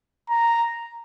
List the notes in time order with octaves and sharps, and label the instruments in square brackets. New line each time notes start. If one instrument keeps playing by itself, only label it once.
[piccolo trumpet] A#5